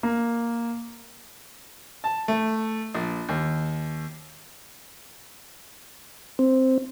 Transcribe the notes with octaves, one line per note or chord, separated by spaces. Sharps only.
A#3
A5
A3
A#1
D#2
C4